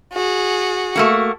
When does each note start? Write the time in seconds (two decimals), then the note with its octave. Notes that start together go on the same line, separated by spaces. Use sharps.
0.13 F#4 G#4
0.96 A3 A#3 F#4